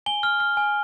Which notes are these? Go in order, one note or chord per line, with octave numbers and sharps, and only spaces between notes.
G#5 G7
F6
F6
G#5